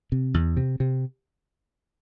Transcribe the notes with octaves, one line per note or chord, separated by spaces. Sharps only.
C3
E2
C3
C3